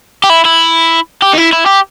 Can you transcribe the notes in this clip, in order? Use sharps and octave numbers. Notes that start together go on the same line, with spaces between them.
G4
E4
E4
G4
D#4
E4
E4
G4